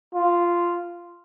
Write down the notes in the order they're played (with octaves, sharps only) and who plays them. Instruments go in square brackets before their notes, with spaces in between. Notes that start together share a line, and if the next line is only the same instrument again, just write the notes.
[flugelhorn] F4